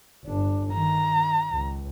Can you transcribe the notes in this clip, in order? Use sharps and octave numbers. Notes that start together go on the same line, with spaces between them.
G1 D4
D#3 A#5
C#2